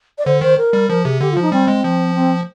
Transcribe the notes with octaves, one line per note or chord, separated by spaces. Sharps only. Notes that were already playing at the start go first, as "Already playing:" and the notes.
D5
D3 C5
D#3 C5
A#4
G3
F3 A#4
C3 G#4
D3 G4
F3 F4
D#4
G3 C4
G#3
F3
C4